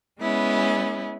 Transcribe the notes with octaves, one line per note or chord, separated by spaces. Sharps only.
G#3 B3 C#4 E4